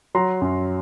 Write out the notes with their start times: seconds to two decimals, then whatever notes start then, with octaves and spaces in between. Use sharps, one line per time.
0.15 F#3 A#5 C6
0.41 F#2